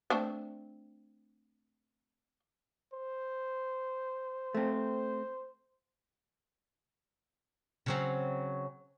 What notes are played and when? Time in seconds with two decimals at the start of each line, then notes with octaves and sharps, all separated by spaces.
0.10 A3 C4 D4
2.93 C5
4.54 A3 C4
7.86 C#3 F#3 C4